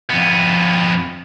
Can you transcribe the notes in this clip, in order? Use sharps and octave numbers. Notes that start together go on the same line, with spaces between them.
F2 B3